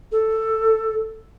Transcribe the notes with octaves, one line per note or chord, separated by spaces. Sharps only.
A4